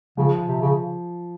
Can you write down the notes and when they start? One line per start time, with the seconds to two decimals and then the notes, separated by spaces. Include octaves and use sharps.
0.17 C#3 F3
0.48 C3
0.61 C#3